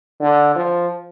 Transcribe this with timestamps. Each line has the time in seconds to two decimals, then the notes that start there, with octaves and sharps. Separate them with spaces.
0.20 D3
0.55 F3